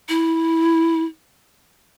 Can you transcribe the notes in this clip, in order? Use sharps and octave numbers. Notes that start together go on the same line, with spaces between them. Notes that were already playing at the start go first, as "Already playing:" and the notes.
E4